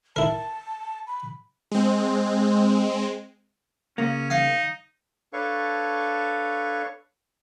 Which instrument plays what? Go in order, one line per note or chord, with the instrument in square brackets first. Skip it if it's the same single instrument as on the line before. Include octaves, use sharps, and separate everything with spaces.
[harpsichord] E4 A#4 [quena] A5
[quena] B5
[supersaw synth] G#3 C4
[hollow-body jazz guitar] C#3 A#3 [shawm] C#4
[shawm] D#4 [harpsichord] F5
[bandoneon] D4 A4 B4 C#5 F5 C#6